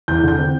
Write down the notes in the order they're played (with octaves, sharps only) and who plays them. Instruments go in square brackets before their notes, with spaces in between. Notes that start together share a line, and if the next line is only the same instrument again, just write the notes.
[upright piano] E2 G6
D3 G6
C4